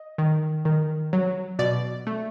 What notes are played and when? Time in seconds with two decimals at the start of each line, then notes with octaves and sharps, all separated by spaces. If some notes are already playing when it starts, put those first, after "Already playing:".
Already playing: D#5
0.18 D#3
0.65 D#3
1.13 F#3
1.59 B2 D5
2.07 A3